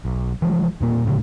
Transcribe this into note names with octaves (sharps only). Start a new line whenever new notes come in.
B1
E3 F3 G#3
E1 A#2 A#3
D2 A2 C#3 G#3